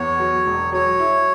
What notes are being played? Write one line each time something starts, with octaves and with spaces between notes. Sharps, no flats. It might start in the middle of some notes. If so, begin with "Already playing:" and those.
Already playing: E2 C#5
F#3
E1
F#3 C#5
E4